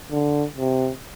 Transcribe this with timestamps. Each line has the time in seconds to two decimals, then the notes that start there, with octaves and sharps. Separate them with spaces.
0.12 D3
0.58 C3